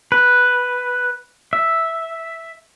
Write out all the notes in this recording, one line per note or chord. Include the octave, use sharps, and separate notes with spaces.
B4
E5